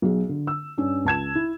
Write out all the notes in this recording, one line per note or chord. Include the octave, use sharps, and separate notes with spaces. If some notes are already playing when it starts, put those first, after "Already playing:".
B1 F#3 G#4
D3
E6
G2 C#4 D4
C#2 A5 G#6 E7
E4